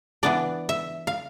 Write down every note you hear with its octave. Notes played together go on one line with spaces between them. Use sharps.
E3 B3 D4 D5
E5
F5